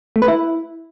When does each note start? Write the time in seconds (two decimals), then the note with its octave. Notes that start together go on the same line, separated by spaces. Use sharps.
0.16 A3
0.22 B4
0.28 E4